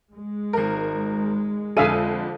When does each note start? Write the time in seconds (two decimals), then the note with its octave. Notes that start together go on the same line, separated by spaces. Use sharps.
0.13 G#3
0.53 G#1 A#4
1.77 F2 D3 G#4 E5 F5 D#7